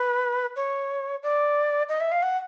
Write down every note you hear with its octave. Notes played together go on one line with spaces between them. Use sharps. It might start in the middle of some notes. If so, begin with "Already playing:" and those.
Already playing: B4
C#5
D5
D#5
E5
F5
F#5